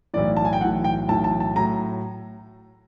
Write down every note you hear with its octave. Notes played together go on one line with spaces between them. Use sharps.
B1 A2 E3 D5
A5
G#5
G5
B1 A2 E3 F#5
G5
B1 A2 E3 A5
A5
A5
A2 F#3 A#5